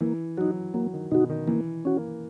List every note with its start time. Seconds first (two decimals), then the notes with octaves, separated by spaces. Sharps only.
0.01 E3 A#3
0.37 F#3 D#4 F#4
0.74 F#3 A#3
0.93 D#3
1.11 B2 D#4 F#4
1.30 D#3
1.48 E3 A#3
1.85 C#4 F#4
1.97 A#3